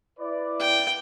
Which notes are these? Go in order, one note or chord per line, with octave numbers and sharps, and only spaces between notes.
E4 B4 D5
G5